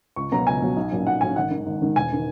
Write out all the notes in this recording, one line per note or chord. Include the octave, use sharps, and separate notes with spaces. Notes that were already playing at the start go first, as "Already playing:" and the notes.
C#2 C#6
B2 F#3 B3 A#5
C#2 G#5
B2 F#3 B3
B1
A#2 F#3 C#4
B1 F#5
A#2 F#3 C#4 G#5
G#1 F#5
G#2 D#3
G#1
G#2 D#3
E1 G#5
D#3